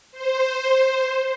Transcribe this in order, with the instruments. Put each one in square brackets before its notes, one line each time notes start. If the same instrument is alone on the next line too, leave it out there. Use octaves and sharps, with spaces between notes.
[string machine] C5